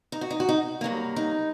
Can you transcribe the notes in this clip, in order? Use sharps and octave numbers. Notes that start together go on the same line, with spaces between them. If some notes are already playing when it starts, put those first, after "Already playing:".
D#4
F#4
D#4
F#4
D#4
G2 F#3 A#3
D#4